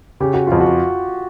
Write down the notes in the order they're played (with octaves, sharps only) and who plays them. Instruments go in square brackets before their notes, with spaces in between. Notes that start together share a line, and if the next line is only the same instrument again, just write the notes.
[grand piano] C#3 [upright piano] G4
[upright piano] F#4
[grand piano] F2 [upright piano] F4
[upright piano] F#4